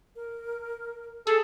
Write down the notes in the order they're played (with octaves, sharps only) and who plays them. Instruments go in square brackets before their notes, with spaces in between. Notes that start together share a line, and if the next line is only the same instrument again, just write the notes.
[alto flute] A#4
[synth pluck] G#4 [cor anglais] A4